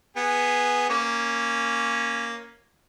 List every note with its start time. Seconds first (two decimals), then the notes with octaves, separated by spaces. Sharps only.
0.16 B3 G#4
0.89 A#3 C#4